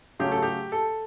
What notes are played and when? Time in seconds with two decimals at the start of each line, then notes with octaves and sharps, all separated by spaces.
0.19 C#3 F#3 A3 C#4 G4
0.32 A4
0.42 G4
0.72 A4